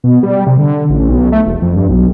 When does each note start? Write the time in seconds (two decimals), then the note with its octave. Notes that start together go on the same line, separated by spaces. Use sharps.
0.04 B2
0.23 G3
0.46 C3
0.59 D3
0.90 A1
1.09 B1
1.32 A3
1.46 E1
1.62 F2
1.76 G2
1.89 B1